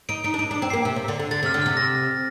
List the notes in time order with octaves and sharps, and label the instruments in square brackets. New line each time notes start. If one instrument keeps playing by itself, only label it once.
[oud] D#4 [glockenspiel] D7
[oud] D#4 [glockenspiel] D7
[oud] D4
[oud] D#4 [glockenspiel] D7
[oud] D4
[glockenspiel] D7
[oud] C4
[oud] A#3 [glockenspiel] C7
[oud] C3
C3
D3
D3
[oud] D3 [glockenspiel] A6
[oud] C3
[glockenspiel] F6
[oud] D3
[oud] C3 [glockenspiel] F6
[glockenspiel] A#6